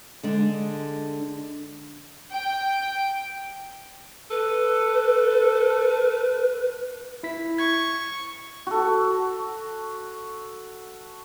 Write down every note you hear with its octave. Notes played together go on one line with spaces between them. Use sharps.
D3 G#3 D4
G5
A4 B4
E4 B6
C#6 G#6
F#4 A4